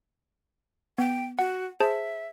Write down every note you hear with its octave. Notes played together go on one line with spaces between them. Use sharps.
B3 G5
F#4 F#5
G#4 C5 E5 A5